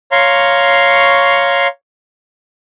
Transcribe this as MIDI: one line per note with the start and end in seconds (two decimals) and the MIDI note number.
0.12 1.67 73
0.12 1.67 77
0.12 1.67 82
0.12 1.67 84
0.12 1.67 85